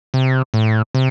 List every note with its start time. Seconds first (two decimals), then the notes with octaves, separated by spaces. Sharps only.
0.14 C3
0.54 A2
0.95 C3